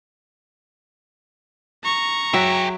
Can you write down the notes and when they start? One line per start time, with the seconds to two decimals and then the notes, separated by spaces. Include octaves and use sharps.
1.84 A#5 C#6
2.33 F#3 F#4 G#4 E5 G5